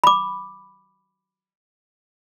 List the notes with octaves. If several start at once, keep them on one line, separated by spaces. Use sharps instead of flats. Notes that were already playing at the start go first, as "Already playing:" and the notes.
B5 D6